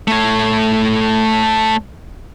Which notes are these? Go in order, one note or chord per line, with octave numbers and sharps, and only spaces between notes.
A3 C#5